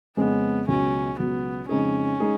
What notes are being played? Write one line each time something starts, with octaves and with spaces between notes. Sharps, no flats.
F2 C#3 G#3 B3 C#4 G#4
C#2 B2 F#3 C#4
C#2 B2 F#3 B3
F2 C#3 G#3 C#4 D#4 G#4
G#3 D#4 G#4